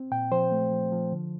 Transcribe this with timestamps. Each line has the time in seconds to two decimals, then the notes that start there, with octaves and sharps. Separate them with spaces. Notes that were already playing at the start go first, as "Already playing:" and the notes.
Already playing: C4
0.11 A#2 G5
0.32 F3 C5
0.52 A3
0.72 F3
0.92 F3
1.12 D3